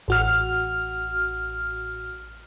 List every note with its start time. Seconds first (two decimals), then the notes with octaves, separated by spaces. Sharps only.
0.08 A1 F#4 F6